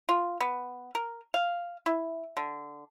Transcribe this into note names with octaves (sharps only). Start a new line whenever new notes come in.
F4
B3
A#4
F5
E4
D3